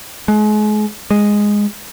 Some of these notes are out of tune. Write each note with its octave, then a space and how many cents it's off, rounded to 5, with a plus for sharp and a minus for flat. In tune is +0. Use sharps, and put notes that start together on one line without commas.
G#3 +35
G#3 -5